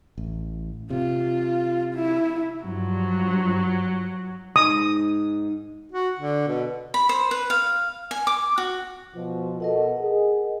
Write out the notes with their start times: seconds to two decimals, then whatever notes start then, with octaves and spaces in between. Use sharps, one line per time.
0.18 A1
0.90 C3 F4
1.94 E4
2.65 G2 F3 F#3
4.56 G#2 D#6
5.92 F#4
6.19 D3
6.48 B2
6.94 B5
7.09 C5
7.31 B4
7.50 F5
8.11 G#5
8.27 D6
8.58 F#4
9.16 B2 F3
9.60 B2 A4 A#4 D#5 F#5
10.00 G#4